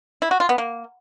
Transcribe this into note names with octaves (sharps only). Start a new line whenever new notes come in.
E4
F#4
F4
B3
A#3